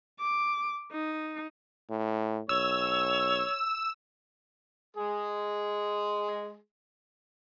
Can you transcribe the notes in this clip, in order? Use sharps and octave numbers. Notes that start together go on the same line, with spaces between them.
D6
D#4
A2
B1 C#5 E6
G#3 G#4